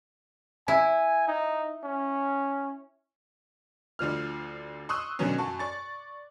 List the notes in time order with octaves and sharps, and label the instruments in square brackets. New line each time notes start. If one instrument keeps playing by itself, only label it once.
[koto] E4 [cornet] G#5
[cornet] D#4
C#4
[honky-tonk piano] D2 D3 F3 F6
C6 C#6 D#6 E6 F#6
B2 D3 D#3 F#3 B3 C#4
F#2 F#4 A5 C#6
D5 C#6 A6